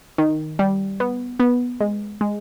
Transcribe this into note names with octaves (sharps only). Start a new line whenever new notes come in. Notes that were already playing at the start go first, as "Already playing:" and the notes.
D#3
G3
B3
B3
G#3
G#3